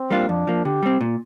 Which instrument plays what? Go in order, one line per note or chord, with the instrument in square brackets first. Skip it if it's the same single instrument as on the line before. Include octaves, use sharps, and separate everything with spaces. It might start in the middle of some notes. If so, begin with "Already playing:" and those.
Already playing: [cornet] C4
[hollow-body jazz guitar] G3 A#3 D4 F4
[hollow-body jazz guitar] F2 [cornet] D4
[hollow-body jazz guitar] F3 A#3
[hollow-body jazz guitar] D3 [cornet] G4
[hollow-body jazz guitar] G3 C4
A#2